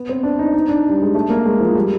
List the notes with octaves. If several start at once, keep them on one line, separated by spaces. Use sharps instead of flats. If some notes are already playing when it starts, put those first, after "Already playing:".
Already playing: B3
C4
D4
D#4
D#4
D4
G3
G#3
A3
A#3
G#3
F3
G3